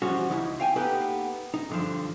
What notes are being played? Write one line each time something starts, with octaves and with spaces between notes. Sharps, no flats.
E3 F3 G3 C#4 F#4
C#2 D#4 E4
F5 G5 G#5
A#3 B3 D#4 G4 A4 B4
D#4
G2 D3 F3